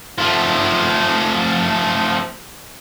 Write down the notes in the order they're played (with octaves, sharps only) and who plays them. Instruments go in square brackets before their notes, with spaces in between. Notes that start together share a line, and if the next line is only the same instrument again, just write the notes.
[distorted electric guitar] F3 A3